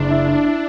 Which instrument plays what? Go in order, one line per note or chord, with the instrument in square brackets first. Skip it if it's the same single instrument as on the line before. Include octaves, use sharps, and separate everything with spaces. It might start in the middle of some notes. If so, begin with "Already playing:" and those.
Already playing: [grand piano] F#1 [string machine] D4
[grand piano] E4
E4
E4